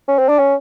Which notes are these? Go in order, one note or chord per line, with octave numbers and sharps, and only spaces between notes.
C#4
C4
D4
C#4